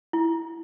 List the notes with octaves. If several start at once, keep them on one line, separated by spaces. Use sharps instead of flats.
E4